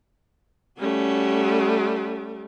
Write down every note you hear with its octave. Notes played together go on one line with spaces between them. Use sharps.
G3 A3 C#4 F#4